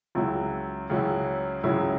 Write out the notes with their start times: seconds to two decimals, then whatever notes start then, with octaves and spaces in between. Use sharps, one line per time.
0.15 C#2 C#3 F#3 C#4 E4
0.90 C#2 C#3 F#3 C#4 E4
1.63 C#2 C#3 F#3 C#4 E4